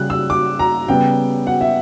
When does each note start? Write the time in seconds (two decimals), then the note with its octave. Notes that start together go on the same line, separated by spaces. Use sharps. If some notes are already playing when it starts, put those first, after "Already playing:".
Already playing: C#3 G3 C#4 F#6
0.10 E6
0.30 D6
0.59 A#5
0.88 C#3 G3 B3 G5
1.47 F#5
1.61 E5